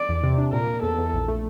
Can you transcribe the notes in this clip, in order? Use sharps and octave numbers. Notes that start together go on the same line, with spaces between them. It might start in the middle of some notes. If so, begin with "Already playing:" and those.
Already playing: D5
E2
C3
D4
A#2 A#4
A#2
E2 A4
E2
A#1
A3